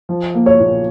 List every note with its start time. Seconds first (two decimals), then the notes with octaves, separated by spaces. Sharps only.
0.09 F3
0.34 A#3
0.46 C#5
0.60 A#2